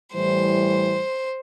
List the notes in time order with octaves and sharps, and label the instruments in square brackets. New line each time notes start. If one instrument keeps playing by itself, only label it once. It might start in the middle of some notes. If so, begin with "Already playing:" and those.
[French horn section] A2 E3 G3 [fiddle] C5